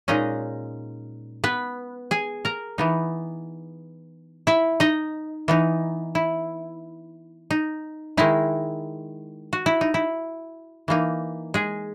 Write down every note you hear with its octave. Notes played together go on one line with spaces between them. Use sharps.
A#2 G#3 C#4 D#4 D#5
B3 B4
G#4 G#5
A#4 A#5
E3 B3 D#4
E4 E5
D#4 D#5
E3 B3 D#4
E4
D#4
D#3 G#3 D#4 E4
F#4
E4
D#4
E4
E3 A#3 D#4
G#3 G#4